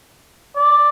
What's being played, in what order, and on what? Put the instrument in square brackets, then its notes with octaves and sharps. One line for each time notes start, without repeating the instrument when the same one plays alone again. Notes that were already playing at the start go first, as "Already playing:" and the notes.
[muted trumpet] D5